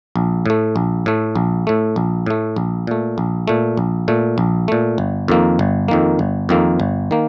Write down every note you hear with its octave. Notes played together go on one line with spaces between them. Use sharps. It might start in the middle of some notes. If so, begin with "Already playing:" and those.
A#1
A2 A3
A#1
A2 A3
A#1
A2 A3
A#1
A2 A3
A#1
A#2 A3
A#1
A#2 A3
A#1
A#2 A3
A#1
A#2 A3
G1
F2 D#3 A#3
G1
F2 D#3 A#3
G1
F2 D#3 A#3
G1
D#3 A#3